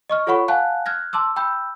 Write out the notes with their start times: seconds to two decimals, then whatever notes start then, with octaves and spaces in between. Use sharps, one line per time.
0.10 D#5 C#6 F6
0.27 F4 A4 C#5 F#5 B5 C#6
0.48 F5 F#5 G#5 A5 F#6
0.86 F6 F#6 G#6 A#6
1.13 A5 C6 D6 E6
1.36 G5 B5 E6 G6